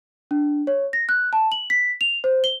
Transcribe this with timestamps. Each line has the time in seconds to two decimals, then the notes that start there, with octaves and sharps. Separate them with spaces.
0.31 D4
0.67 C#5
0.93 A#6
1.09 F#6
1.33 A5
1.52 F#7
1.70 B6
2.01 F7
2.24 C5
2.44 G7